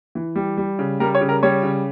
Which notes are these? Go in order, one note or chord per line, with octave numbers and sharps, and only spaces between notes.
E3
G3
G3
C#3
G3 A#4
C#5
C#3
A#4
G3 C#5
C#3